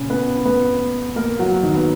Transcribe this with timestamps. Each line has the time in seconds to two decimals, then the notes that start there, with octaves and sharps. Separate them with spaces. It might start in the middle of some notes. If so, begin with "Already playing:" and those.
Already playing: A#2 C#3 C#4
0.10 B3 B4
0.45 B3 B4
1.16 A#3 A#4
1.39 F#3 F#4
1.63 D#3 D#4
1.75 B3